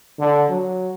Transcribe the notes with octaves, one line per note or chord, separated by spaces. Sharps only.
D3
F#3